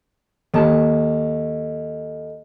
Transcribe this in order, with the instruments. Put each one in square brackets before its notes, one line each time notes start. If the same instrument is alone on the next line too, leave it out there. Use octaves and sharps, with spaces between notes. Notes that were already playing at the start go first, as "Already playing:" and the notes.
[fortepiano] D#2 A5 [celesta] A4 D#5